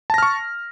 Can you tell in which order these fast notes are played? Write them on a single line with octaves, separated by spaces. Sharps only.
A5 A#6 F6 C#6